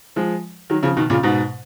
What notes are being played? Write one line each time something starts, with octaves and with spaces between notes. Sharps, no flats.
F3 G#3
D#3 F#3
C#3 F3
B2 D#3
A#2 C#3
G#2 B2